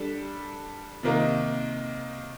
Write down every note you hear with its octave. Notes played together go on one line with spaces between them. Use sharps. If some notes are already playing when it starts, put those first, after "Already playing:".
Already playing: G3 D4 A4
C3 D#3 A#3 D#4